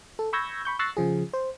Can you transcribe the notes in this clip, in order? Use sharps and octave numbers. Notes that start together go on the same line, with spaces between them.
A4
B5 C#6 E6 G6 G#6 A#6
B5 C#6 G6
C#6 E6 F#6 A6 A#6 C7
C#3 F3 G#4
C5